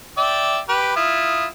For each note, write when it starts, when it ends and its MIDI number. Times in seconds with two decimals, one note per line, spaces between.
0.17 0.59 74
0.17 0.59 76
0.17 0.59 79
0.69 0.94 67
0.69 0.94 71
0.96 1.46 64
0.96 1.46 65
0.96 1.46 87